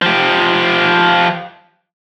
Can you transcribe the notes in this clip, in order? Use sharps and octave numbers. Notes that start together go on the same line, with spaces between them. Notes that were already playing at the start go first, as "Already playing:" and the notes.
F3 G4